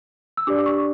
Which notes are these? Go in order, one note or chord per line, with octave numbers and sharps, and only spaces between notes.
E6
D4 G4 D5 D6
C#6